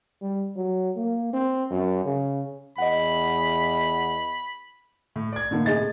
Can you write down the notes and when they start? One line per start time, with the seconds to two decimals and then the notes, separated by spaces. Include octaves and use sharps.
0.22 G3
0.56 F#3
0.97 A#3
1.33 C4
1.71 F#2
2.05 C#3
2.78 E2 D#5 F#5 B5
5.16 A2
5.32 D5 G#6
5.51 A2 D3 A#3 D#4
5.66 A2 C3 G#4 D#5 A6